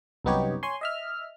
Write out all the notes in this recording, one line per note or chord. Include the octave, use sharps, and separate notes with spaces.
C2 F#2 B3 D#4 G4 C#5
C#5 G#5 C6
D#5 E5 F6